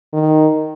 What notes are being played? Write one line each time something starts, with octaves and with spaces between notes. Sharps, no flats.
D#3